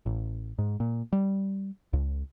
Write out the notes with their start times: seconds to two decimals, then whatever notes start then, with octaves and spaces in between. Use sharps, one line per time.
0.06 A1
0.59 G#2
0.80 A#2
1.12 G3
1.93 C#2